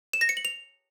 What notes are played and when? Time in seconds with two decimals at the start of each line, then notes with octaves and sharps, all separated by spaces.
0.13 E7
0.21 A#6
0.29 C#7
0.37 F#7
0.45 F7